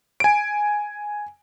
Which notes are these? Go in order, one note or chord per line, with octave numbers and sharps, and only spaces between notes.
G#5 D7